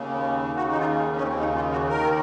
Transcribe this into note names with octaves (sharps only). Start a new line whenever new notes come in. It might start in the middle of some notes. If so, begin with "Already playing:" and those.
Already playing: D#2 C#3
D#2 C#3 F#4
D#4
F4
C#4
D#2 C#3 C4
D#4
F4
F#4
D#2 D#3 A#4